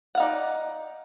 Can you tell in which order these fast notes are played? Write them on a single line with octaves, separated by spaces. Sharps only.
F#5 F5 D#4 D5